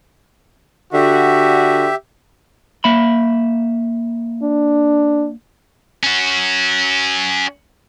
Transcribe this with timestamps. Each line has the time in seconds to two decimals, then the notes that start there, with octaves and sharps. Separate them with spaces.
0.93 D3 F#4 G4 E5
2.84 A#3 E5 B5
4.43 D4
6.03 C#4 F#4